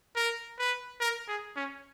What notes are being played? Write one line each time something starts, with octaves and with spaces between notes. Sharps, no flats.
A#4
B4
A#4
G#4
C#4